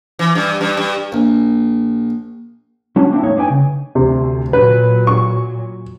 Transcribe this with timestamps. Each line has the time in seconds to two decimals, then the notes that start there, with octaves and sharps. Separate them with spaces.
0.19 E3
0.35 G2
0.61 G2
0.77 G2
1.12 A#1
2.96 F#3 C#4 D4
3.11 A#3 C4 D4 E4
3.23 F2 A2 A#3 D#4 C#5
3.36 F#2 D4 D#4 B4 G5 G#5
3.50 C#3
3.95 D2 C3
4.53 A#2 F#3 B4
5.07 C#6